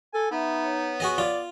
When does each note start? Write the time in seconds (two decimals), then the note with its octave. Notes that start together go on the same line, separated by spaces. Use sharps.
0.14 A4 G#5
0.31 B3 D#4 E5 B5
0.64 C#5
1.00 F#4 G#4 D#5
1.18 F4 D5